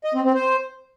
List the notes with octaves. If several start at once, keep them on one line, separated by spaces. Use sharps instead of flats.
D#5
C4
C4
C5